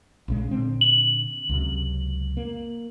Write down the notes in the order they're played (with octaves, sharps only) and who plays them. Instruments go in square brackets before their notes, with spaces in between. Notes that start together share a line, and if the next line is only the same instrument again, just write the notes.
[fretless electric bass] A#1 C#3 G#3
A#2 D3 C4
[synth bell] F#7
[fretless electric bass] C#2 F#2 C3
A#3